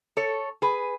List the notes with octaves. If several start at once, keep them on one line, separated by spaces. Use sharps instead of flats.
A4 C#5
G#4 B4